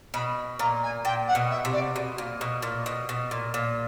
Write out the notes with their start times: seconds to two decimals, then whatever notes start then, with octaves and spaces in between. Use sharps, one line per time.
0.14 B2 B5
0.59 A#2 A#5
0.82 G#5
1.05 A#2 G5
1.28 F#5
1.35 B2
1.49 E5
1.65 C3
1.72 D5
1.96 B2
2.18 A#2
2.41 B2
2.62 A#2
2.86 B2
3.09 B2
3.31 A#2
3.54 A#2